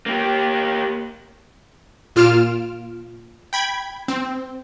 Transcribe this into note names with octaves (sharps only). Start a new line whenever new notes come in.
A#3 G4
A#2 F4 F6 D7 E7
G5 B5 G#6
C4